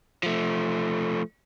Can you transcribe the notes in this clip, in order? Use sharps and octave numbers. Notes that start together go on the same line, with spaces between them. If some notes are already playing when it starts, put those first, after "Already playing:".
F3 A3